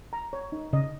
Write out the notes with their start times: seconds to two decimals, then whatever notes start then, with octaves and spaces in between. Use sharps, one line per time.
0.13 A#5
0.33 C#5
0.52 D#4
0.73 C#3 D#5